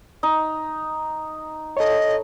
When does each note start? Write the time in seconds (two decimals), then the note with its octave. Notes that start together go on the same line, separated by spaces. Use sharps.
0.23 D#4
1.77 A4 C#5 D#5